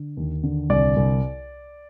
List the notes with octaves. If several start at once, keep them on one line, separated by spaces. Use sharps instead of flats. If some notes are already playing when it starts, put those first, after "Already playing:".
Already playing: D3
D#2
D3
C2 D5
C2